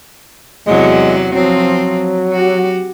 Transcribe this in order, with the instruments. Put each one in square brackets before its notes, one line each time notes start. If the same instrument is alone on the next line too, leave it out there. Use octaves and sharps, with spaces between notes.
[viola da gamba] E2 C3 F#3 [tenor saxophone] G#3
[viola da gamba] F3 C4 [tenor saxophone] F#3
[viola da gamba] F#4 G4